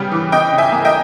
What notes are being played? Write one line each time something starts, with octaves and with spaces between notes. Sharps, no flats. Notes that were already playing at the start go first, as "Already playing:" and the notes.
Already playing: C#3 G3 B3 G5
E3
C#3 D#5 G5
C#3
E5 G#5
A#3
D#5 G5